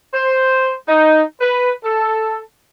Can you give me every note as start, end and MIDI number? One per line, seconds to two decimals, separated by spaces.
0.14 0.71 72
0.88 1.21 63
1.41 1.72 71
1.84 2.39 69